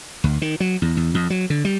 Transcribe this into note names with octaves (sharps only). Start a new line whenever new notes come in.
D2
D#3
F#3
E2
E2
F2
F#3
D3
G3